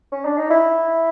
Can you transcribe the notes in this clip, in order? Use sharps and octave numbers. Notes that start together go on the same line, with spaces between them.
C#4
D4
D#4
E4